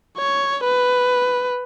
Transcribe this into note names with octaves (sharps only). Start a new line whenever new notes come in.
C#5
B4